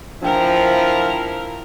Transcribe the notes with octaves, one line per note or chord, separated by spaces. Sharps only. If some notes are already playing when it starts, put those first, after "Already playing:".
F3 D4 E4 A#4 G5